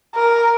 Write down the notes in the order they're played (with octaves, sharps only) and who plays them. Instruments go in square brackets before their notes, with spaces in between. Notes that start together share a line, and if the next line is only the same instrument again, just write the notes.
[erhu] A#4